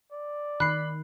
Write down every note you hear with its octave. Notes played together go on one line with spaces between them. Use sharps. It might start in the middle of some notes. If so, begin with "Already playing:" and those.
D5
D#3 B5 F#6 C7